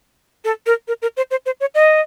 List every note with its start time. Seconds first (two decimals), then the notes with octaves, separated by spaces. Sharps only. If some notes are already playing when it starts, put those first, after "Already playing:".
0.45 A4
0.66 A#4
0.88 A#4
1.02 A#4
1.17 C5
1.31 C5
1.46 C5
1.60 C#5
1.75 D#5